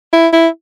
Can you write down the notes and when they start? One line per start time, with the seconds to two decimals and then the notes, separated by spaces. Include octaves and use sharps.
0.13 E4
0.33 E4